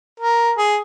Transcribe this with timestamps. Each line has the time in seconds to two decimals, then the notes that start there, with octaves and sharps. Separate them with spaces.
0.20 A#4
0.58 G#4